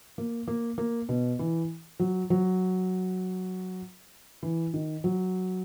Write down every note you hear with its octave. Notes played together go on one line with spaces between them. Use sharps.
A#3
A#3
A#3
B2
E3
F#3
F#3
E3
D#3
F#3